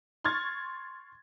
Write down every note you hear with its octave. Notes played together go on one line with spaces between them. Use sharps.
C6 C#6 F6 G#6 A6